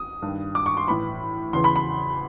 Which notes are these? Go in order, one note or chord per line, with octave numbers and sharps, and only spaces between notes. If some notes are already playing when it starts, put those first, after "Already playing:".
Already playing: D#6
G2 D#3
D6
C#6
C6
A2 E3 B5
E2 C#3 E3 C6
B5
B5